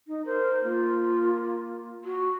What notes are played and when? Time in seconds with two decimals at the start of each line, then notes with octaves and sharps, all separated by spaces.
0.08 D#4
0.26 A#4 C5
0.64 A#3 F4
2.04 F#4